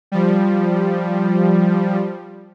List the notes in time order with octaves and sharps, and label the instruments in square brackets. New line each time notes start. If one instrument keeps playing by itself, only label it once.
[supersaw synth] F3 G3